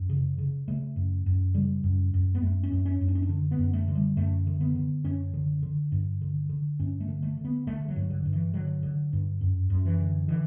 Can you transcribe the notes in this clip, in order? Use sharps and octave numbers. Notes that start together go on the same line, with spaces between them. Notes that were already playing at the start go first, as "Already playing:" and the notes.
Already playing: F#2
C#3
C#3
C#3 A3
F#2
F#2
C#3 G3
F#2
F#2
B3
F#2 A3
C#4
F#2
C#4
F#2
D4
C#4
D4
D3
B3
F#2
A3
D3
G3
F#2 A3
D3
B3
D3
F#2 C#4
D3
D3
G2
D3
D3
G2 C#4
A3
D3
A3
D3
B3
D3 A3
F#3
G2
D3
G2
E3
D3 F#3
D3
G2
F#2
F#2
E3
D3
D3 E3